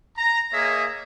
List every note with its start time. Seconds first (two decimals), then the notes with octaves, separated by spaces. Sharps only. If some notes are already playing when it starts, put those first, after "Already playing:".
0.18 A#5
0.53 A#3 G#4 C#5 D#5 E5